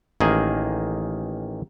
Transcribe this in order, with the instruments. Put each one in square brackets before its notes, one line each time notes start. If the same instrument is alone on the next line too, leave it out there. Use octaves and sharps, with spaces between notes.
[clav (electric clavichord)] A1 D#3 A#3 G#4